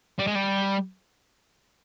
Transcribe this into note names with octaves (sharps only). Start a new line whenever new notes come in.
G3
G#3
G3